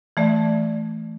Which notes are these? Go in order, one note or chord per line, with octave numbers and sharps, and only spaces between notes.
E3 A3 D5 E5